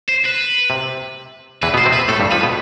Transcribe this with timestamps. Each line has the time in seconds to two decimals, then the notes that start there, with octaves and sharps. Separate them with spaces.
0.08 C5
0.25 B4
0.70 C3
1.62 E2 E3 B4
1.74 B2 B3
1.78 C5
1.86 C3 C4
1.93 B4
2.09 A2 A3 A4
2.20 G2 G3
2.31 F2 F3 B4
2.43 B2 B3